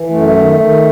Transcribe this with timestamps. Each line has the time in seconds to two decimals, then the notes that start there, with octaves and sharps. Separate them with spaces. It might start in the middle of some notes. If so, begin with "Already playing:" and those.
Already playing: E3
0.10 F#2 A3
0.35 D#3
0.60 D#3